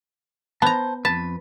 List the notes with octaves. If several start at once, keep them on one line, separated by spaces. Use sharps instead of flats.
B3 C5 A5 A#5
F2 B4 A5